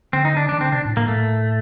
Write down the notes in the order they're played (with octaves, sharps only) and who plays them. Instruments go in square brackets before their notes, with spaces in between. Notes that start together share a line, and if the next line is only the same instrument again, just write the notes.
[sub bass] D3 [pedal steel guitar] C4
[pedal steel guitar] D#4
D4
[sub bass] D#3 [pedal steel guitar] D4
[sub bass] D3 [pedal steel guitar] C4
[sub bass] C3 [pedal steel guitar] D4
[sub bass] A2
[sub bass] A2 [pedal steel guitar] A#3
[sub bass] A2 [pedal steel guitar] A3